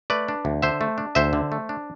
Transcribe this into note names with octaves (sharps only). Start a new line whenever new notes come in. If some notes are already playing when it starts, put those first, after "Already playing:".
A3 B4 D5
D4
D2
D3 C5 E5
A3
D4
D2 C5 E5
D3
A3
D4